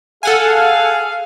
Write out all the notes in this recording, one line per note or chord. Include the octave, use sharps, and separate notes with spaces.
G#4 A4 F5 F#5 G#5